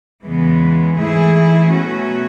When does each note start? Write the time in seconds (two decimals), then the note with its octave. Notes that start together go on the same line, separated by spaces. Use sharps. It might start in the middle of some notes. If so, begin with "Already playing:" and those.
0.24 E2 C#3 E3 G#3 B3
0.98 G#2 E3 A3 E4 G#4
1.71 B2 F#3 A3 C#4 F#4